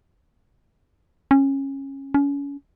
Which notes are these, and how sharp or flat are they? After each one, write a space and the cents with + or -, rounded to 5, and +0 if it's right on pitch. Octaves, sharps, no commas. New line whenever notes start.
C#4 -20
C#4 +30